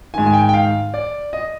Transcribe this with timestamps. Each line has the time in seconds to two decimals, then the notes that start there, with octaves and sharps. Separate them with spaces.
0.14 G#2 D#3 G#5
0.27 G#5
0.34 G5
0.49 G5
0.54 F5
0.94 D5
1.33 D#5